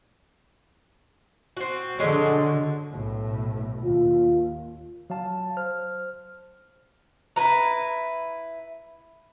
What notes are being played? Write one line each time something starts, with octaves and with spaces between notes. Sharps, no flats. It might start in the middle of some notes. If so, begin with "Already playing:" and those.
C4 F#4
D3 F#3 G#3 C#4
B1 A2
D#2 F4
F#3 F5 A5
C5 F6
E4 B4 A#5